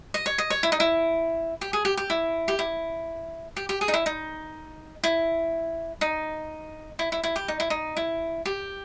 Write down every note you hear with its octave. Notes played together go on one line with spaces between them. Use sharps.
D#5
C#5
D#5
C#5
E4
D#4
E4
G4
G#4
G4
G4
E4
G4
E4
G4
G4
G#4
D#4
E4
D#4
E4
D#4
E4
E4
E4
G4
D#4
E4
D#4
E4
G4